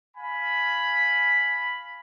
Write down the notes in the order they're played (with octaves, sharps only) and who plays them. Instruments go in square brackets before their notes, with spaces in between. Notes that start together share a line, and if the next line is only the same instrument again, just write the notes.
[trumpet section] F5 G#5 B5